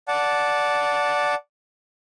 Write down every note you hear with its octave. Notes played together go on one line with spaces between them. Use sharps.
D5 F#5 A5